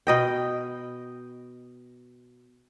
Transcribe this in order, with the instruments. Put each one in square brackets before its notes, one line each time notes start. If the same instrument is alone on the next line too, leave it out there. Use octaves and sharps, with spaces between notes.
[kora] B2 D#5 G5